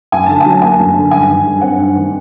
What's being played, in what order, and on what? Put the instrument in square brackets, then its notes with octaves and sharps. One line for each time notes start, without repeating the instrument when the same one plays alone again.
[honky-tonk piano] F#2 G#5
D3 A5
G#5
F#3
A#3 G#5
F#2
D3
G2 G#5
D#3
G3
C4 F#5
G2
D#3